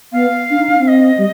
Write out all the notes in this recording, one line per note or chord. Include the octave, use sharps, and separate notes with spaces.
B3 F5
D4
D#4
D4
C4
D#5
G3